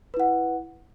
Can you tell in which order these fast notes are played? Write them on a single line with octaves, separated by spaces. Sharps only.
B4 E4 F#5